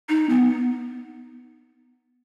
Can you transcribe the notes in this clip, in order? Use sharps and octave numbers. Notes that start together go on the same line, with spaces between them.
D#4
B3